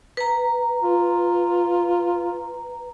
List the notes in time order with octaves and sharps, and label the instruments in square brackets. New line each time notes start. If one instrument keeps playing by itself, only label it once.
[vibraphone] B4 A#5
[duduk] F4